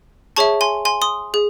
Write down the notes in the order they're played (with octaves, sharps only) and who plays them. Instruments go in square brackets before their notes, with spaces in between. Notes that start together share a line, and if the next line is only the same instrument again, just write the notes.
[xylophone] G#4 C#5 E5 A5 C#6
G#5 C6
G#5 C6
C6 D#6
G#4